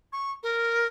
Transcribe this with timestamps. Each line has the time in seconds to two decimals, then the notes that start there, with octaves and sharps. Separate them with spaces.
0.12 C#6
0.43 A#4